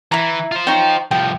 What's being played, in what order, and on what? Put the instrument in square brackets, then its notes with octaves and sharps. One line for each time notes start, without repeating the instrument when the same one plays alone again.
[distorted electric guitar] E3 [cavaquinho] E4 A#5
[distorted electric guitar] F4 C5
[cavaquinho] D#4 C#5 G5
[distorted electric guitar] C2 F3 [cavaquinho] G5